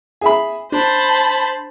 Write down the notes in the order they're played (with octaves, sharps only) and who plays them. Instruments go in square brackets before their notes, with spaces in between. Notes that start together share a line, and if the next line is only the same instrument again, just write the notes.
[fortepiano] G#4 E5 B5
[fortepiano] D4 [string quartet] C5 A5 B5